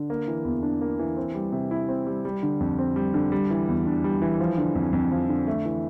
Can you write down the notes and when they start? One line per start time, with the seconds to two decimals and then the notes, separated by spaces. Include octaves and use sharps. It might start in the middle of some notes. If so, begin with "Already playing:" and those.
Already playing: D3
0.10 A#3
0.28 E3
0.45 E2
0.63 D4
0.81 A#3
0.99 E3
1.17 C4
1.35 G3
1.52 C3
1.71 E4
1.89 C4
2.07 G3
2.25 G3
2.43 D3
2.60 F2
2.79 C4
2.96 G3
3.14 D3
3.32 G3
3.50 E3
3.68 E2
3.86 D4
4.04 G3
4.22 E3
4.40 F3
4.57 D3
4.75 F2
4.93 F2
5.11 F3
5.28 D3
5.47 A3
5.65 E3